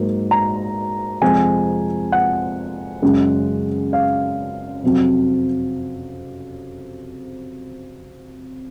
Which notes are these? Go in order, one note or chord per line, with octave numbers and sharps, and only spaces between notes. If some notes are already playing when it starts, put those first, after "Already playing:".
Already playing: G#2 F#3 A#3
A#5
F2 C3 F3 G#3 G#5
F#5
F#2 C#3 G#3
F5
F2 C3 F#3